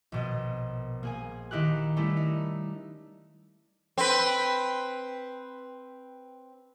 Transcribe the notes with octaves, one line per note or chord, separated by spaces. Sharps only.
A#1 B2 D#5
A#3 G#4 G#5
D#3 D#4 E4 G4 F#6
G3 A3 C#4 E4
D#4
C4 B4